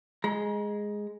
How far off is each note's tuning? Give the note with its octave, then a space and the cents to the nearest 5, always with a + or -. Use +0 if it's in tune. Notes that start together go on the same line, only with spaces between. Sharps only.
G#3 +0 A#5 +35